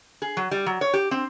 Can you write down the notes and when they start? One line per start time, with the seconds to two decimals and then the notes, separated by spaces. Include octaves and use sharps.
0.22 G#4
0.37 F#3
0.51 G3
0.66 F#3
0.81 C#5
0.93 G4
1.11 C4